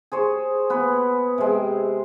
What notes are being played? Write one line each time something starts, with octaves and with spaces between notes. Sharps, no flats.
G#4 C5 C#5
B3 B4
C3 G#3